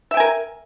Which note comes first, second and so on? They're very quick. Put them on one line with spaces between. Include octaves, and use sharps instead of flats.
E5 G5 G#5 A#4